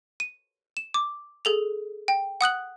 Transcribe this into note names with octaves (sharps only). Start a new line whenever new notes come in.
D#7
E7
D6
G#4 A4 F7
G5
F#5 D#6 F#6 F#7